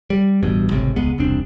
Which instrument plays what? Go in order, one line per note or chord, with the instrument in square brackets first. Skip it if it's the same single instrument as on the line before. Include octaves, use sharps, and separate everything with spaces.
[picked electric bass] G3
A1 G2 B2
G#1 C#2 A2 C3
E1 C#2 G#3 B3
E1 C2 C4 D4